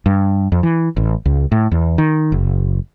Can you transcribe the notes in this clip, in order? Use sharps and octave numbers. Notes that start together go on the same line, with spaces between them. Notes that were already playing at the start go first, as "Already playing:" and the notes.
G2
F2
E3
A1
C#2
A2
E2
D#3
F#1